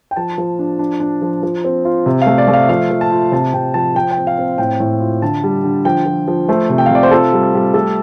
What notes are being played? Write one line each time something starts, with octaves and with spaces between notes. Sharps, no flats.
G5
F3 A5
F3
D4
D4
D4
F3
F3
C4
F4
C3
A3 F5
D5
A3
F5
F3 F5
F3
A5
F4
C3 A5
C3 G5
F3 A5
F3 G5
G5
C4
F5
C4
A2 G5
A2
F4
D3 A5
G3
D3
F3 G5
F3
F3
A3 C5
C3
G5
F5
C3 D5
C5
F4 A4
G3
G3
A3 A4